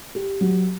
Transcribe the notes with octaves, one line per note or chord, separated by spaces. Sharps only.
G4
F#3